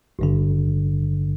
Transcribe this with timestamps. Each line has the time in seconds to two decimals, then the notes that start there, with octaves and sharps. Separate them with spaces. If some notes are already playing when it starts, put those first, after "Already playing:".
0.19 G#1 G2 D3